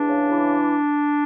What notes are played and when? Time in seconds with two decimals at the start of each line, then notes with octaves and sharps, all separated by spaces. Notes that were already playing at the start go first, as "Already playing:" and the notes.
Already playing: E2 D4
0.10 C#3
0.31 E3